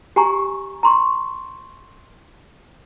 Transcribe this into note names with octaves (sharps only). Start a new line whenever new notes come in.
G4 G#5 A#5 C#6
A#5 C6 C#6